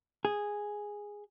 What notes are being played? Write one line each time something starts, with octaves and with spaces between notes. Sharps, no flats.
G#4